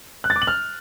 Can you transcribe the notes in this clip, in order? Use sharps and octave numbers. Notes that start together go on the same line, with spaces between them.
F#6
A6
D6
F#7
F6